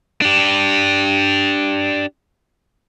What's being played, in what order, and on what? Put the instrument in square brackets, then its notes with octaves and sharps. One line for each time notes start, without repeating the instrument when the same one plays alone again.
[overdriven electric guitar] D4 G4